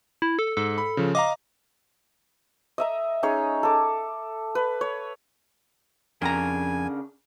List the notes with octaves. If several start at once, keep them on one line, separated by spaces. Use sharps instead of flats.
E4
A4
G#2 A4
B5
C#3 F3
D#5 F5 A#5 D6
D#5 E5 A#5
C#4 D#4 G#4 C#5
A4 D6
B4
C#5
F2 C#3 D4 A#4 G#5 A#5